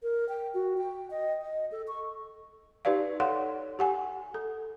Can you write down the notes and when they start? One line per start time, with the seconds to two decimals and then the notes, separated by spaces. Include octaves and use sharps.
0.03 A#4
0.29 G5
0.54 F#4
0.78 G5
1.11 D#5
1.42 D#5
1.72 A4
1.88 C#6
2.85 D#4 G4 B4 D5 F5
3.20 A4 C#5 F5 F#5 C6
3.79 G4 F#5 G#5
4.34 A4